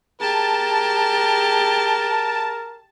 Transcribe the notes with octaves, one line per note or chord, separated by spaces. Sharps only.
G4 G#4 A#4 A5